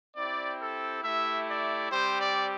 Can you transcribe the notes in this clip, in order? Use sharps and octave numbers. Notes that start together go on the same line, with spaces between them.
C4 E4 G4 D5
A4
A3 E4 G4 E5
D5
G3 C4 G4 C5
D5